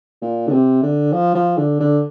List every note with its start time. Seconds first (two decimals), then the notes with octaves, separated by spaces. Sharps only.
0.22 A#2
0.47 D3
0.52 C3
0.83 D3
1.13 F3
1.35 F3
1.58 D3
1.80 D3